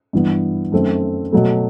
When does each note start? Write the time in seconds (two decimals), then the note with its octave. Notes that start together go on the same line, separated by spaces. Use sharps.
0.13 G2 E3 B3
0.72 F#2 D#3 A3 C4
1.33 B2 F#3 A3